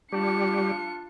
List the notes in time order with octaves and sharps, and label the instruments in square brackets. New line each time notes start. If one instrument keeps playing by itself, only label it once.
[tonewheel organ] G3 G4 [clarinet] D4 [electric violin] F4 C#7